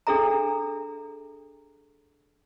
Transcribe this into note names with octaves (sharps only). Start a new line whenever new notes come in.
D4 G#4 A4 E5 A#5